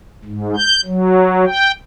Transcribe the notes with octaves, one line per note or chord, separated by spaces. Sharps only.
G#2
G6
F#3
G5